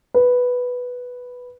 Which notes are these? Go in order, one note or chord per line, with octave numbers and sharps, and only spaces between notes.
B4